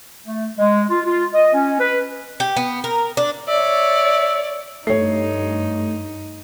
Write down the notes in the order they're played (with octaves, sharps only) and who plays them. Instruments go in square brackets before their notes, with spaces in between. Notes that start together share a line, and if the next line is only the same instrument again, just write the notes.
[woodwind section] A3
G#3
F4
F4
D#5
C#4
B4
[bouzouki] G4
B3
A#4
D4
[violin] C#5 D5 [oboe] E5
[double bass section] G2 [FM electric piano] A3 [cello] D#4 [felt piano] C#5 C7